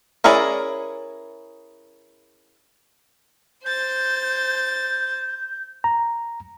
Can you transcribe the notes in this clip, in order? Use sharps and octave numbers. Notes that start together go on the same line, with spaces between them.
C#4 E4 G#4 A#4 D5
C5 G6 A6
A#5